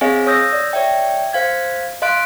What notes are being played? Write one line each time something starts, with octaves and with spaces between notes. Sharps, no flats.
C4 G#4 C#5 D#5 F5 G#5
C#5 D#6 E6 G6 A#6
D5
C#5 D5 E5 G5
C5 F5 G#6
D#5 F5 C6 F#6 D7